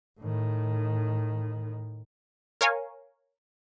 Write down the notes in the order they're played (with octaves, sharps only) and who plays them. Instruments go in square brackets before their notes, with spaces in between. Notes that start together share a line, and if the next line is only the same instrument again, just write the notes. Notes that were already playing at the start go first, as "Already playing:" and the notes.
[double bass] A2 D#3
[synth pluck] A#4 C#5 F5 G#5